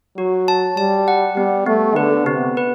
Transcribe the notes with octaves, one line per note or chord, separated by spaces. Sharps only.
F#3 F#4
A5
G3 A5
F#5
G3 B3
A3 B3
D3 B4
C3 B3
B4